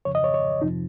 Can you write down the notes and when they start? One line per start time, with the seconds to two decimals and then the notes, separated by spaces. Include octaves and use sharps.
0.05 F2 C#3 F3 C#5
0.15 D#5
0.24 C#5
0.34 C#5
0.62 F2 C3 F3 D#4